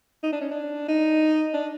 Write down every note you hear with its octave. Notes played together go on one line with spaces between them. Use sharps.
D#4
D4
C#4
D4
D#4
D4